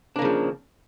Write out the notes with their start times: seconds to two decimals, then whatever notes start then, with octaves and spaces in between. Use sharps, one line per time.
0.16 D4
0.19 A#3
0.22 C#3
0.25 F3